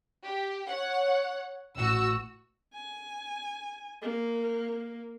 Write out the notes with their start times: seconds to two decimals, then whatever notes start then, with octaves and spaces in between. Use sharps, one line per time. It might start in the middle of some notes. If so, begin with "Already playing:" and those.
0.25 G4
0.69 C#5 F#5
1.77 A1 F#4 E6
2.74 G#5
4.02 A#3